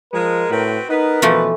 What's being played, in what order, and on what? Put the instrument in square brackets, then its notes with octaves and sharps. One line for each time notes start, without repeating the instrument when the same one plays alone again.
[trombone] F3 [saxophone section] G#3 [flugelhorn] A#4
[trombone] A2 [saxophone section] C4 F#4 B4
[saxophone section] B3 B4 [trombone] D#4 [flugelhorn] A#4
[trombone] B2 [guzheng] E3 F3 A3